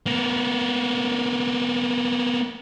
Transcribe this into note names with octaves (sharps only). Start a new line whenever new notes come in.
A#3 B3